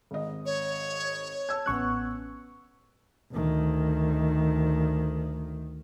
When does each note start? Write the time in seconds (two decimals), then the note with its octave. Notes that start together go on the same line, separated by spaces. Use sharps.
0.11 G#1 D#5
0.46 C#5
1.49 A5 E6 G#6
1.66 A1 B3 C#4 C#6 F#6
3.33 D2 D#3